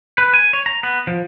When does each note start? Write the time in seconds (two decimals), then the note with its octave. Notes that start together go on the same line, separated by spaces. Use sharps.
0.18 B4
0.34 G#5
0.53 C#5
0.66 A#5
0.83 B3
1.07 F3